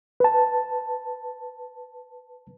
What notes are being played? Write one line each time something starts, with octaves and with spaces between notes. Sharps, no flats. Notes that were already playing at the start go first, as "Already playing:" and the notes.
B4 A5